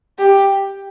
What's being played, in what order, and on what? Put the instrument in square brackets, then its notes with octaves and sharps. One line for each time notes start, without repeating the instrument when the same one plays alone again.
[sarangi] G4